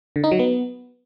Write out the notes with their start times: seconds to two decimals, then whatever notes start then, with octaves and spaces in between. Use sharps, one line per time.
0.16 D3
0.24 D#4
0.31 F#3
0.39 B3